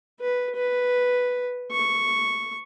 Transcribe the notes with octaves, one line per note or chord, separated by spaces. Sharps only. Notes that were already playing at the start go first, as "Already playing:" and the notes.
B4
B4
C#6